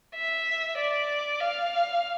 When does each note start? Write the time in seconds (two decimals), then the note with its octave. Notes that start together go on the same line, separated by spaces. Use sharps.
0.15 E5
0.78 D5
1.40 F5